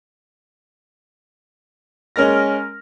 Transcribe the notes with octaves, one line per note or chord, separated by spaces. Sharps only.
G#3 C#4 A#4 F6 A#6